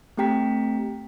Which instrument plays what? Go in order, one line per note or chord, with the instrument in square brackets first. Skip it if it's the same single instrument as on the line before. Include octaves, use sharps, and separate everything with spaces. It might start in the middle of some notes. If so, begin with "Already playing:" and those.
[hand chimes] A3 C4 G4 G5 A#5 B6